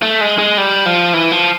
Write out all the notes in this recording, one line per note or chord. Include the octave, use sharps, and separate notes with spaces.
A3
G#3
G#3
G3
F3
E3
F3